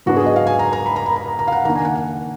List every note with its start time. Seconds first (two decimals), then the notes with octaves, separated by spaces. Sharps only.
0.06 G#2 F#3 B3 D4 F#4
0.16 G#4
0.26 D#5
0.36 F5
0.47 G#5
0.59 A#5
0.73 A#5
0.86 B5
0.96 A#5
1.06 B5
1.16 A#5
1.39 A#5
1.48 F5
1.52 F#5
1.65 D#3 A#3 D4 A#5
1.75 G#5
1.85 F#5
1.95 F#5